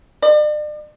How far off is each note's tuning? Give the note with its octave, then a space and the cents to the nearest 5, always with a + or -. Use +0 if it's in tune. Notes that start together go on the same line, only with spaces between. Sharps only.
D5 +40